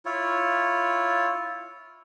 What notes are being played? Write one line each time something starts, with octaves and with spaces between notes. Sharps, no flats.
E4 F4 C#5